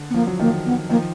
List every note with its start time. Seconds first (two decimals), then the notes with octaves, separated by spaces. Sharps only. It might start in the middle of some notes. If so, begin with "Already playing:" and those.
Already playing: D3
0.10 B3
0.14 F3 A#3
0.27 F#3
0.39 D#3 F3 A#3
0.65 B3
0.89 D#3 F3 A#3